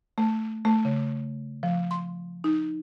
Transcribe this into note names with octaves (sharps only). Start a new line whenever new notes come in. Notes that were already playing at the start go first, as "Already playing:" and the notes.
A3
A3
C#3
F3
C6
D#4